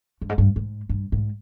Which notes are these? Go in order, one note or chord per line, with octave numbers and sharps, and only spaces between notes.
G2
G#2
G2
G#2
G2
G#2